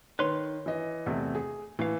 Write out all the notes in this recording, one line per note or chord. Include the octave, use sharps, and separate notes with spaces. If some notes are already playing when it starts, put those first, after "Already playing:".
D#3 B4 C#5 C6
E3 D#5
E2 C3 A3
G#4
A2 E3 F5